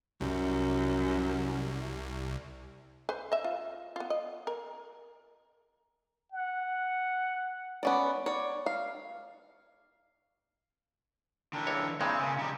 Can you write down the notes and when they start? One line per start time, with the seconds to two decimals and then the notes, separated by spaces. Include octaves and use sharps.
0.21 C2 F#2
3.09 B4 C5
3.32 D#5 E5
3.44 F4
3.96 B3 F4
4.10 D#5
4.47 A#4
6.32 F#5
7.83 B3 C#4 D5
8.26 C#5 D5
8.66 F5
11.53 D3 E3 D4 A#4 G5
11.67 C#2 C#5
12.01 G2 A#2 G#3 C4 E4 G5
12.20 C#3 A#3 C#4
12.39 C#3 G3 D#4 B5